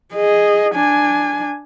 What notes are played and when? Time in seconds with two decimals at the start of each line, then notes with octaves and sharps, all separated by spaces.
0.14 G#4 D#5
0.74 D4 G#5